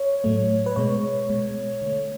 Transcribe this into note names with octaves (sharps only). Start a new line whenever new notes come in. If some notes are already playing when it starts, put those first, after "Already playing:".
Already playing: C#5
A2 F#3 A3
B4
B2 G#3 C#5
B2 G#3
D3 A3